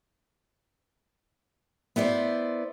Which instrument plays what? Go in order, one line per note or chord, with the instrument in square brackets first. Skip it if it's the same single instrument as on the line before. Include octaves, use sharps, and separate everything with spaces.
[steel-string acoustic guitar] B3 E4 C5 D5